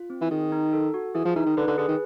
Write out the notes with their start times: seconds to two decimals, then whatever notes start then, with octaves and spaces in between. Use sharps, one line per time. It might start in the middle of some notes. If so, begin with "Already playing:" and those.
Already playing: F4
0.10 C4
0.21 E3
0.31 D#3 G#4
0.52 D#4
0.73 A4
0.94 F#4
1.15 E3 G#4
1.25 F3
1.36 E3 D#4
1.46 D#3
1.57 D3 B4
1.67 D3
1.78 D3 G#4
1.88 D#3